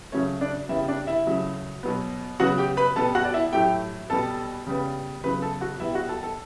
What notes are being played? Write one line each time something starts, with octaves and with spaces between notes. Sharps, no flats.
C#3 F#3 A3 C#4 C#5
D4 D5
C#3 G3 B3 E4 E5
D4 D5
E4 E5
C#3 F#3 A3
B2 F#3 B3
C#3 F#3 B3 F#4 F#5
G4 G5
B4 B5
B2 G3 B3 A4 A5
F#4 F#5
D5
E4 E5
A2 F#3 A3 G4 G5
B2 G3 B3 A4 A5
C#3 G3 B3
C#3 F#3 B3 B4 B5
A4 A5
F#4 F#5
B2 G3 B3 E4 E5
F#4 F#5
A4 A5
A4 A5